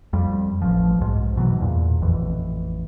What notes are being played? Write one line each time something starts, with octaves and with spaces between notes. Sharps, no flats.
F2 G3
A1 F3
B1 G#2
G#2 B2 E3 F#3
E2 A#2
A1 F2 E3